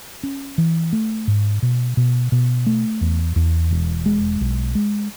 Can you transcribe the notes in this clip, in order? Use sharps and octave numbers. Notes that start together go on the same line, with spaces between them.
C#4
E3
A3
G#2
B2
B2
B2
A3
E2
E2
E1
G#3
B1
G#3